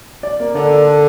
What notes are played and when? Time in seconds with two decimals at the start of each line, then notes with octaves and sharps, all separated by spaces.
0.23 D5
0.40 A#3
0.55 D3 D5
0.71 D5
0.87 A4